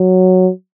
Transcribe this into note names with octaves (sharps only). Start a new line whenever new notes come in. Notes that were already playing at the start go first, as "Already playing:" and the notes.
Already playing: F#3